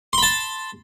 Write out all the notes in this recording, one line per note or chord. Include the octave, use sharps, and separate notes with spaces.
A5 B5 C6